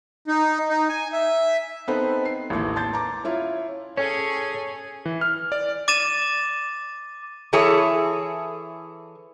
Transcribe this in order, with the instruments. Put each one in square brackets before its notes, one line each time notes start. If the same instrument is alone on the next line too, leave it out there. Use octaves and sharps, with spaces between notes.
[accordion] D#4
D#4
G#5
E5
[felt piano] B3 C4 D#4 A4 B4 C5
C7
A1 D#2 E3 A3
A5 C6 G6 A6
A#5 D6
C#4 E4 F4 C#5
[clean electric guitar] C#4 [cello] G#4 A4 [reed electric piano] C#5 G#5
[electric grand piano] E3
F6
D5
[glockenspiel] D6 A6 D#7 E7
[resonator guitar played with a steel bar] E3 E4 G#4 A4 C#5